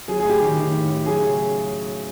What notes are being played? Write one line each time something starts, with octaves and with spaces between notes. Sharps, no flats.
F#3 G#4
G#4
A2
G4
D#3
D#3
A2
A2
F#3 G#4
C#3